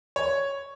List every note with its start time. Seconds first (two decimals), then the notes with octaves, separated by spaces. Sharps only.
0.16 C#5